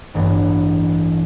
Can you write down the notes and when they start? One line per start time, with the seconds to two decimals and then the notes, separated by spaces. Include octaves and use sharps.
0.14 A1 G2 E3 B3